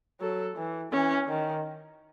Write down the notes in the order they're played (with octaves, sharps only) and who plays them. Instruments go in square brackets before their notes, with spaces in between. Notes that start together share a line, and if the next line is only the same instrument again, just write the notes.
[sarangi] F#3 [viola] A4
[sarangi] E3
[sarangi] E3 [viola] C#4
[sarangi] D#3